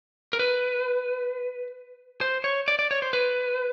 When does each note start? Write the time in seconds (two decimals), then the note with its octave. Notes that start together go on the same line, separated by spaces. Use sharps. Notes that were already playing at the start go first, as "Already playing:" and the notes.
0.33 A#4
0.39 B4
2.21 C5
2.44 C#5
2.68 D5
2.79 D5
2.91 C#5
3.02 C5
3.13 B4